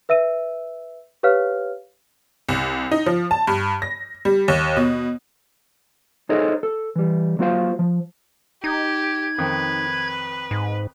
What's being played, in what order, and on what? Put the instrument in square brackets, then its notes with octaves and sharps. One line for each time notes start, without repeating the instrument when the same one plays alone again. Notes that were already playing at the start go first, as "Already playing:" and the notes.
[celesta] B4 E5 E6 D#7
G4 B4 C#5 F5 F6
[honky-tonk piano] C2
D#4
F3
A5
G2
A#6
G3
D#2
B2
[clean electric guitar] D#4 G#4 A4 C5 C#5 D#5
A4
E3 G3
F#3 A#3 F4 F#4 C5 F5
F3
[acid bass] D#4 [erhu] G4 [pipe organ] G#6
[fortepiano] F2 D#3 [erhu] B4
[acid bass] G#2